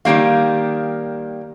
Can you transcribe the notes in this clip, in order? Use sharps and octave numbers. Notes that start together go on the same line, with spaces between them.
D#3 G3 A#3 F5